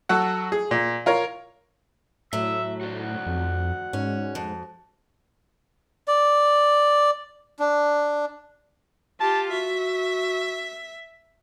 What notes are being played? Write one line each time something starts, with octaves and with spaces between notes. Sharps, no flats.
F#3 F#4 A4 F#5
G#4
A#2
F4 A#4 C#5
A2 F#3 E5 E6
F#4 C5 D5 F#5
F2
G#2 C#4
F2
D5
D4
F4 G4 A5
F#4 E5